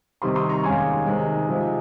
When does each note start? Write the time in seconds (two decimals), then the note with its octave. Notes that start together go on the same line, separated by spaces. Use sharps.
0.22 C3 D#3 G3 C4 C6 D#6
0.35 C6 D#6
0.49 A#5 C#6
0.63 D#2 D#3 G#3 C#4 G#5 C6
1.06 C3 D#3 G#3
1.48 C3 F3 G#3